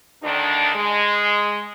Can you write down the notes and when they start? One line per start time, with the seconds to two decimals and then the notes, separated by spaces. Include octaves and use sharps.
0.24 D2 D#3 D4
0.75 G#3